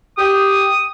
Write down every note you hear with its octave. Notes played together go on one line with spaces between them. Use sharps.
G4 D#6